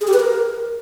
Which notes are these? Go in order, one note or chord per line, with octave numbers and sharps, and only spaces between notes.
G#4
G4
B4
A#4